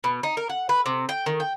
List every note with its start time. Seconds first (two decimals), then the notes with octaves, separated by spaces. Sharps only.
0.04 B2
0.23 D#4
0.37 A#4
0.49 F#5
0.69 B4
0.86 C3
1.09 G5
1.26 D#3
1.40 G5